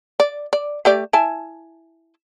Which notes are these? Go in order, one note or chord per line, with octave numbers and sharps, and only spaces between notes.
D5
D5
A3 G4 D5
E4 G#5 A5